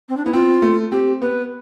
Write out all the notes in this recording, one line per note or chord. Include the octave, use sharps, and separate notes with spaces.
C4
D4
B3 E4
C4 F4
A3
C4 G4
B3 B4